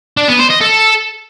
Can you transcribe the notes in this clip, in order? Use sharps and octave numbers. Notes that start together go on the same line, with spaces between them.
D4
B3
C5
D#5
A4